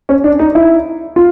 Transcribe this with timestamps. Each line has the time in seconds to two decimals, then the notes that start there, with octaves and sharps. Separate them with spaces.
0.09 C#4
0.24 D4
0.39 D#4
0.55 E4
1.16 F4